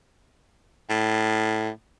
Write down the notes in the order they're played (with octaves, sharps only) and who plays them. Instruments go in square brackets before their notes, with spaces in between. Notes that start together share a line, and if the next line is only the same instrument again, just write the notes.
[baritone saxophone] A2